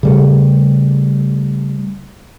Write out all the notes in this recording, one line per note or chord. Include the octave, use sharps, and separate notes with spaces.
C#3 G3 A3